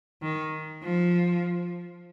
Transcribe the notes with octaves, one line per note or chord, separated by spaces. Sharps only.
D#3
F3